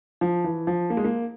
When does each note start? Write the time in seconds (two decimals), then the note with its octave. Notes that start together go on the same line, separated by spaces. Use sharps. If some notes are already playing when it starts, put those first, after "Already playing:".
0.21 F3
0.44 E3
0.67 F3
0.90 A#3
0.97 G#3
1.04 A#3